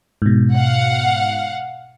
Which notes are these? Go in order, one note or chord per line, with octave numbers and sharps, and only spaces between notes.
G#2 B2
F5 F#5